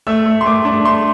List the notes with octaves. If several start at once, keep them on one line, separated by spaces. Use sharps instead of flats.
A3 E6
A3
C6
A3 D6
D4
A3 C6